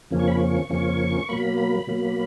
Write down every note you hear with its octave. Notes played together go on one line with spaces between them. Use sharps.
F2 C#3 F3 A#3 C#4
C#6
B5
C#6
F2 C#3 F3 A#3 C#4
B2 F#3 A#3 B5
B5
B2 F#3 A#3